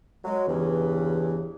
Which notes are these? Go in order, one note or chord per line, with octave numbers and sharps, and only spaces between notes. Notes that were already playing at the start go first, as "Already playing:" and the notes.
F#3 G#3
E2 G2 C#3 E3